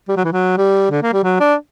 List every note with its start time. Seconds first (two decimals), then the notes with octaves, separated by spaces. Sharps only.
0.09 G3
0.17 F#3
0.25 E3
0.33 F#3
0.58 G3
0.90 D3
1.03 A#3
1.13 G3
1.24 F#3
1.40 D4